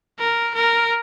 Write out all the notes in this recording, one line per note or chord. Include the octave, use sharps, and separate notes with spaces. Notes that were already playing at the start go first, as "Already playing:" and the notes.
A#4
A#4